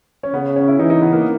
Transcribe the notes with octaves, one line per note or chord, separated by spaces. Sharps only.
C#4
C#3 B3
C#4
E4
E3 D#4
D#4
B3
A#3